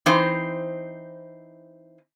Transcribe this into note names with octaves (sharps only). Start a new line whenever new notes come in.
E3 C4 D#4 C5